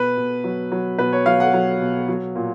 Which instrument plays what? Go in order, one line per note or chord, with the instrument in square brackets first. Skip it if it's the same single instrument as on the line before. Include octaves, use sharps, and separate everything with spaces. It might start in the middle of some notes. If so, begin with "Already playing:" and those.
Already playing: [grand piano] B2 B4
B2
F#3
F#3
B2 B4
C#5
F#3 F5
F#5
F#3
B2
F#3
A#2